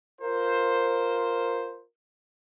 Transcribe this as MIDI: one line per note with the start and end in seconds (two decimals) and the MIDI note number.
0.21 1.83 65
0.21 1.83 70
0.21 1.83 72